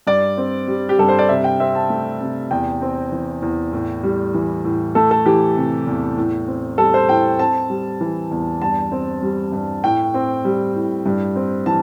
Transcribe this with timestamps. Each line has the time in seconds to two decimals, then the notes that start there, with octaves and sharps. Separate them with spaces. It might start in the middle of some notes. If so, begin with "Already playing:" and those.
0.07 G2 D5
0.38 C4
0.68 G3
0.89 G4
0.99 G2 A4
1.09 C5
1.19 D5
1.29 C3 E5
1.44 G5
1.60 C4 E5
1.75 A5
1.90 A3
2.21 C3
2.51 E2 G5
2.82 C4
3.12 E3
3.42 E2
3.73 A2
4.03 G3
4.34 E3
4.65 A2
4.95 A3 A4
5.11 A4
5.26 E3 G4
5.56 C3
5.87 E2
6.17 A2
6.47 C4
6.78 G3 A4
6.94 C5
7.09 A2 G5
7.39 C4 A5
7.70 G3
8.01 E3
8.31 E2
8.61 G2 A5
8.92 C4
9.23 G3
9.52 G2
9.84 A2 G5
10.14 C4
10.45 G3
10.75 A2
11.06 G2
11.36 C4
11.66 E3 A5